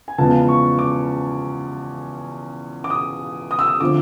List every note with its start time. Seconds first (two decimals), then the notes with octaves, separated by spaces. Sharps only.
0.08 G#5
0.18 E2 C#3 F3 G#3 B3 A5
0.48 C#6
0.79 D6
2.84 D6
2.90 D#6
3.51 D#6
3.59 E6
3.68 D#6
3.80 D3 F3 A3 C4 D6